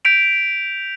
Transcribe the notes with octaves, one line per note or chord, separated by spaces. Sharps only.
G6 B6 D7 F7